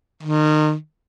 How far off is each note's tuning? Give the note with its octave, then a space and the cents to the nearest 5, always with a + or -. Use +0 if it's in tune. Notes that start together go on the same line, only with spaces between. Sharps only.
D#3 -30